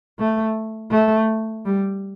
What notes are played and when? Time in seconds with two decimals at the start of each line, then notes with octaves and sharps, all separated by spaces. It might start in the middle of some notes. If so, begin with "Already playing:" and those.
0.19 A3
0.91 A3
1.65 G3